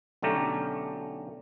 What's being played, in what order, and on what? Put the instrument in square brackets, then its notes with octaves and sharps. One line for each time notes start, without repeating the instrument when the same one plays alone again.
[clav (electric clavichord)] B1 D3 A3 C#4 G4 A#5